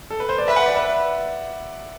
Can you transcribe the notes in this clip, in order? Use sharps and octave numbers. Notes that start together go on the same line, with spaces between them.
A4
B4
C5
D5
B4 E5
F#5
D5
E5